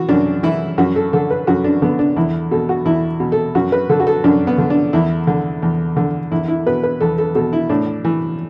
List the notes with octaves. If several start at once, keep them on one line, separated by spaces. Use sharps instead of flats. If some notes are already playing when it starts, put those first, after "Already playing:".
Already playing: E3 F#4
F#2 D4
E3 E4
F#2 F#4
A4
D3 A4
B4
F#2 F#4
D4
D3 B3
D4
E2 E4
B2 A4
F#4
E2 E4
B2
A4
F#2 F#4
B4
D3 A4
F#4
A4
F#2 D4
B3
D3
D4
E2 E4
D3
E2
D3
E2 E4
E4
B2 B4
B4
E2 A4
A4
B2 A4
E4
A2 D4
E3